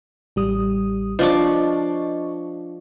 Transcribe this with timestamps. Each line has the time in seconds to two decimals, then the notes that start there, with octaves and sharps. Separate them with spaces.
0.36 A1 G3 D#6
1.19 F3 D4 D#5 C#6 D6